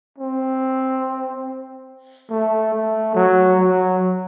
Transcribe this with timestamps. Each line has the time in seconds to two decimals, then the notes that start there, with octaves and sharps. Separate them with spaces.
0.18 C4
2.30 A3
2.74 A3
3.15 F#3
3.59 F#3